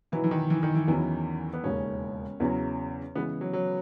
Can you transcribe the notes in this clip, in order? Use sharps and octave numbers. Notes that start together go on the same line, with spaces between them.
B2 E3 F#3 B3 E4
E3
D#3
E3
D#3
E3
E2 D#3 E3 F#3 C#4 E4
B3
E1 D#2 C#3 C#4
E2 C#3 F#3 C#4
C#3 E3 G#3 B3
F#3
F#3